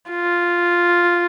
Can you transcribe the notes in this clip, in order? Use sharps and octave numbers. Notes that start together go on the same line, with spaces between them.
F4